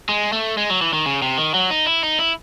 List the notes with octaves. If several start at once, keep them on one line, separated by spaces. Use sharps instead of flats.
G#3
A3
G#3
F#3
E3
D#3
C#3
C3
D#3
F#3
D#4
E4
D#4
E4